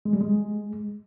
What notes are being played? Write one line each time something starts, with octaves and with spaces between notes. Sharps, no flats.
G#3
G3
G#3